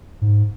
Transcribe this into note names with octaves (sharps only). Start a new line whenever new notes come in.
G#2